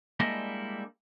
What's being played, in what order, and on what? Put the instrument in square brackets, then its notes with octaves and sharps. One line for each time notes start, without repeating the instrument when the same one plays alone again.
[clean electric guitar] G3 G#3 A#3 D4 E4 D#5